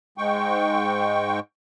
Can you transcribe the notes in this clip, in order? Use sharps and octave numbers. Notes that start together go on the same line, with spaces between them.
G#2 G#3 G5 C#6